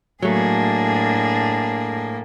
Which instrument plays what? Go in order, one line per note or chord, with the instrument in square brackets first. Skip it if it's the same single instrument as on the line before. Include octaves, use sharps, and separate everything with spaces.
[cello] A2 A#3 [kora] F#3 A3 [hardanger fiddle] D4 G#4